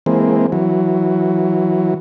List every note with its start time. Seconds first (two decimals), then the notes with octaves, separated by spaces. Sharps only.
0.06 E3 G#3 A#3 C4
0.52 E3 F#3